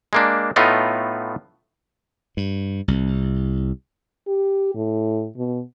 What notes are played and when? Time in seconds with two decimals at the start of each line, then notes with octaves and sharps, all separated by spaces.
0.13 G#3 A#3 D4
0.56 A2 A3 B3 D#4 F4 D#5
2.37 G2
2.88 C2
4.27 G4
4.75 A2
5.37 B2